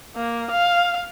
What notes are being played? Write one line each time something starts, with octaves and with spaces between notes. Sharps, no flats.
A#3
F5